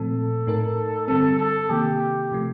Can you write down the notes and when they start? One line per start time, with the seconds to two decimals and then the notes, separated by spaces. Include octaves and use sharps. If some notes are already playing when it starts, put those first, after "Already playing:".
Already playing: A#2 F3 A3 C4 A4
0.47 A2 A3 D#4 A#4
1.08 G2 D3 G3 C4 A4
1.39 A4
1.70 C3 D#3 A#3 G4
2.32 C3 F3 A3